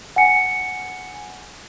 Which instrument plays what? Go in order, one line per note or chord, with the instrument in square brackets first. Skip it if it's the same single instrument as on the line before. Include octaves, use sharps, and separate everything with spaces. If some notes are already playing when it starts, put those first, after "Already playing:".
[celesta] F#5 G#5 C#7